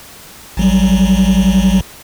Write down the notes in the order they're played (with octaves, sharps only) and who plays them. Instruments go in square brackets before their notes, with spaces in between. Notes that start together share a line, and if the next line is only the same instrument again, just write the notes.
[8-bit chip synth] A1 F#3 G3